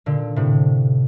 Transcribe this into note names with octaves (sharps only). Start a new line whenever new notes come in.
A#2 D3
A2 C3